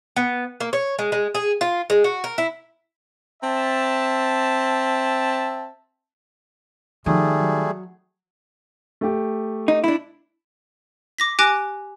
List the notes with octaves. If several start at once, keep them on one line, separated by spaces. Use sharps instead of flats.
B3
A#3
C#5
G#3
G#3
G#4
F4
G#3
F#4
A#4
E4
C4 E5 A5
D#3 F3 G3 A3 G#4
F#3
A3 G4
D#4
D4 E4
D6 A#6 B6
G4 G#5 D6 F#6 A#6 D7